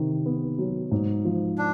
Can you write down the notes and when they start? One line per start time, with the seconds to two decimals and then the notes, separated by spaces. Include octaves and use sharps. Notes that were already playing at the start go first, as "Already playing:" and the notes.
Already playing: C3 D#3
0.26 B3
0.58 F#3
0.91 G#2
1.25 F3
1.58 D4